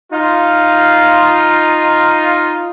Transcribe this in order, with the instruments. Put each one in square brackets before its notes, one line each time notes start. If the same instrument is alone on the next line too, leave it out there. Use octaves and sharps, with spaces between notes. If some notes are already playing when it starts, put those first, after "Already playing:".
[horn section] D#4 F4